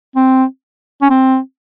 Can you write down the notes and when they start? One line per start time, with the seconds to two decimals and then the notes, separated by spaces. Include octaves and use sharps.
0.16 C4
1.02 C#4
1.10 C4